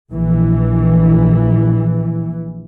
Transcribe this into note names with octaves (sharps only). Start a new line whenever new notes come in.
A#1 E3